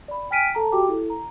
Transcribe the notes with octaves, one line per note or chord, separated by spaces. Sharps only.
D5 B5
G5 G#5 F6 B6 D7 D#7
A4 A5 A#5
F#4 G4 G5 D6
E4 A4
A#5